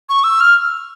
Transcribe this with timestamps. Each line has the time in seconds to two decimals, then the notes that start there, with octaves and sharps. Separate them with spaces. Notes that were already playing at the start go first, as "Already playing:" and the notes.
0.09 C#6
0.24 E6
0.40 F6